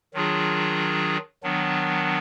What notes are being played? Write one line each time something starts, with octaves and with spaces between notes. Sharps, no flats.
D#3 F#3 D4 F4 G#4
D#3 F#3 B3 D4